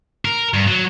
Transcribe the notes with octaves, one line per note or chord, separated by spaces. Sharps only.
A#4
G2
F#3